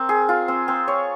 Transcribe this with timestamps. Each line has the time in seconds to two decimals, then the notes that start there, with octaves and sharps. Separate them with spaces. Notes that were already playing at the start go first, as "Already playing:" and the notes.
Already playing: C4 A#4
0.09 G#4
0.29 F4
0.48 C4
0.68 C4
0.88 C#5